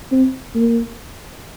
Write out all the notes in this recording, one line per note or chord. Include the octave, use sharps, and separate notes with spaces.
C4
A#3